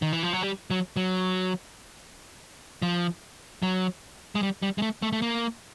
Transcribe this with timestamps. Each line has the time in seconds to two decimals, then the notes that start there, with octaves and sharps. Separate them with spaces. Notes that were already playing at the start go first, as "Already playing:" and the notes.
0.02 D#3
0.12 E3
0.23 F3
0.33 F#3
0.43 G3
0.70 F#3
0.96 F#3
2.82 F3
3.63 F#3
4.35 G#3
4.43 G3
4.62 G3
4.78 G#3
4.82 A3
5.02 A3
5.13 A3
5.22 A#3